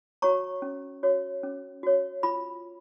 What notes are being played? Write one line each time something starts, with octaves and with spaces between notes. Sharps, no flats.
F#4 C#5 A#5 C#6
C#4
F#4 C#5
C#4
F#4 C#5
F4 B5